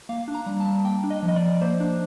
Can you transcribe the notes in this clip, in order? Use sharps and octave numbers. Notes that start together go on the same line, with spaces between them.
A#3 F5
D4
A#5
G3
A5
G3
A#3 G5
D4
D#5
F3
D#5
D5
F3
A#3 C5
D4